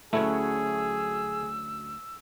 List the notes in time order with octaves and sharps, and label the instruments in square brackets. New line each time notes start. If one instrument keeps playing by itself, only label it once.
[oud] D2 F#3 C#4 [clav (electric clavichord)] A3 E4 [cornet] G#4 [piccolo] E6